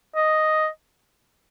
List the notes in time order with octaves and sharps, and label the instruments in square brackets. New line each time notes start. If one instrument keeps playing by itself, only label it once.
[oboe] D#5